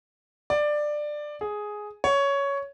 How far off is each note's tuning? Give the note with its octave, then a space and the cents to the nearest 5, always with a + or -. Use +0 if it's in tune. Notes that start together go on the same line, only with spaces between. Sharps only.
D5 +15
G#4 +5
C#5 +10